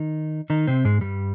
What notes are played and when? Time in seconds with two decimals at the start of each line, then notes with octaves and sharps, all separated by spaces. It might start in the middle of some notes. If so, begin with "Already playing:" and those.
Already playing: D#3 D#4
0.50 D#3 D#4
0.67 C3 C4
0.85 G#2 G#3
1.01 G2 G3